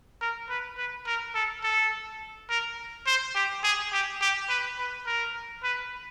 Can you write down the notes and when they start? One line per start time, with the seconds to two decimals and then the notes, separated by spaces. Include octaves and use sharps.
0.21 A#4
0.49 B4
0.78 B4
1.07 A#4
1.35 A4
1.64 A4
2.50 A#4
3.07 C5
3.35 G4
3.64 G#4
3.92 G4
4.21 G4
4.49 B4
4.78 B4
5.07 A#4
5.64 B4